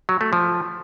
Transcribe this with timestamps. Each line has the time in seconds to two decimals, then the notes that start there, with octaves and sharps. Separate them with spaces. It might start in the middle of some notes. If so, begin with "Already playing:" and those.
0.09 F#3
0.21 A3
0.33 F3